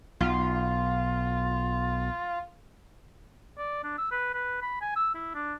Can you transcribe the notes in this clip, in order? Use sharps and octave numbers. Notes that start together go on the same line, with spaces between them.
B1 F4
D5
D4
E6
B4
B4
B5
G#5
E6
E4
D4